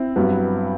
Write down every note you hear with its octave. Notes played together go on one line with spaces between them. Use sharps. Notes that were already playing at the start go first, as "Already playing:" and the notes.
Already playing: C4 E4
G2 F#3 B3